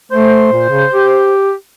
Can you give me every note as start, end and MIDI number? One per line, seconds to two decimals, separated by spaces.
0.12 0.50 57
0.12 1.33 72
0.53 0.68 46
0.70 0.85 49
0.93 1.53 67